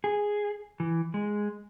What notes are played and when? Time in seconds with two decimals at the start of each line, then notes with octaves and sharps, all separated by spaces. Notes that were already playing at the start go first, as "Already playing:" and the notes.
0.04 G#4
0.80 E3
1.14 G#3